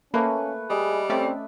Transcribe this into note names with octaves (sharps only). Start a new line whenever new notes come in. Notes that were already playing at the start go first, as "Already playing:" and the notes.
A3 A#3 C#4 B4
G3 G#4 D#5
A3 C4 C#4 D5 E5